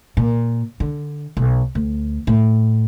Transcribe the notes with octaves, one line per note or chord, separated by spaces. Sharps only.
A#2
D3
B1
D2
A2